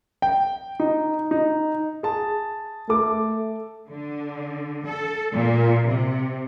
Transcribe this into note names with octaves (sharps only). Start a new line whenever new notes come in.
G5
D#4
D#4
G#4 A5
A3 A4 D6
D3
A4
A#2
C3